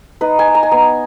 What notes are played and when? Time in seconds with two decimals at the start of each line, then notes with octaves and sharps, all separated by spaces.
0.21 D#4 B4
0.39 G#5
0.47 D#4
0.55 A#5
0.63 G#5
0.72 B3 A#5